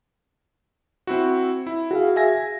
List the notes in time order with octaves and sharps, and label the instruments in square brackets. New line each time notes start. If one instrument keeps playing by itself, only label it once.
[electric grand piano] C4 E4 F#4
E4
[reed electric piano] F#4 G#4 F5
[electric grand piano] E5 G#5 A#6